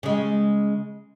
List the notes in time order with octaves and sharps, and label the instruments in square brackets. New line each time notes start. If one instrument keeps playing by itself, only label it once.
[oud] C#3 G#3